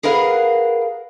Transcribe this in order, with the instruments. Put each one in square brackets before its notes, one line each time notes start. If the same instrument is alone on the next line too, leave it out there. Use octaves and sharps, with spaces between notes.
[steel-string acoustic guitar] G#4 A#4 B4 F5 F#5